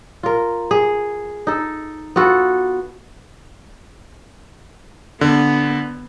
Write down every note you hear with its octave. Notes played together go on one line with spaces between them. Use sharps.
F4 A#4
G#4
D#4 A4
B3 F4 F#4 A4
D3 B3